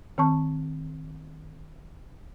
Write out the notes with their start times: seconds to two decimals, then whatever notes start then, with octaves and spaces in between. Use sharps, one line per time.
0.18 D#3 C4 A5 C#6